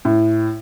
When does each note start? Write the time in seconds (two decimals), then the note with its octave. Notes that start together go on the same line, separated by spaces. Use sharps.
0.05 A2